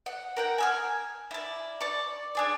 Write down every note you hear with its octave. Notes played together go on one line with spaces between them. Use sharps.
F#5
A#4 F#5 G5
G#5 E6 F6
E4 D5
D5 C#6
D4 G#4 D5